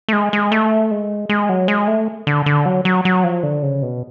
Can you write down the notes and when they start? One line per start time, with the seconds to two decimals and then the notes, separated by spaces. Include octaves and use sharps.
0.08 A3
0.13 G#3
0.33 G#3
0.52 A3
0.91 G#3
1.29 G#3
1.49 F#3
1.68 G#3
1.88 A3
2.27 D3
2.46 D3
2.66 F#3
2.85 F#3
3.05 F#3
3.24 F3
3.43 D3
3.63 C#3
3.82 B2